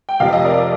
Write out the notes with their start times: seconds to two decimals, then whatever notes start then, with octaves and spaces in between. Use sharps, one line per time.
0.09 G5
0.20 F1 F2 C3 F5
0.33 D#5
0.45 A#4 D5